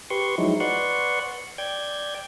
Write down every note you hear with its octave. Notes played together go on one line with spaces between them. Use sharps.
G4 B4 C6 C#6
F3 F#3 G#3 D#4 E4
B4 D5 F#5 C6 C#6 F#6
D5 G5 G6 G#6